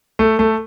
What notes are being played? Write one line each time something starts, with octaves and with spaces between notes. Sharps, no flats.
A3
A3